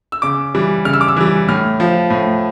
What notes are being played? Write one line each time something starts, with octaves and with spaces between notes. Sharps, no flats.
E6
C#3 D6
E3 G3
C#3 F6
E6
D6
E6
E3 G3
A2 F6
F3
A2